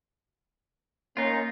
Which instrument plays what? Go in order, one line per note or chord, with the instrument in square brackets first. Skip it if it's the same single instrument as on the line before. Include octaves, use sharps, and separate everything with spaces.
[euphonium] A#3 [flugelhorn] C#4 [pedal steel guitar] D#4 F4